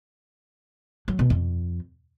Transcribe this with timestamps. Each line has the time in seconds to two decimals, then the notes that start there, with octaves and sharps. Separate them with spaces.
1.08 F#3
1.19 B2
1.30 F2